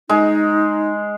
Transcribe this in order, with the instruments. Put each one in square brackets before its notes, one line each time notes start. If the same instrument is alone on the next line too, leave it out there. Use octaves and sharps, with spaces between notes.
[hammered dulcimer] G#3 [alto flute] D#4